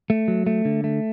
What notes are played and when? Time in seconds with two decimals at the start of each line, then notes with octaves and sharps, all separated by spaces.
0.10 A3
0.28 F#3
0.47 A3
0.65 D3
0.84 A3